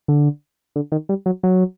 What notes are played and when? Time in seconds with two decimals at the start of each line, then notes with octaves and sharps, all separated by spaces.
0.08 D3
0.76 D3
0.92 D#3
1.09 G3
1.26 F#3
1.43 F#3